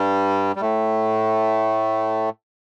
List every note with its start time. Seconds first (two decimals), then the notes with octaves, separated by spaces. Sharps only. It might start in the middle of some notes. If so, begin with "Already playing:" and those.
Already playing: G2 G3
0.56 G3
0.61 A2 A3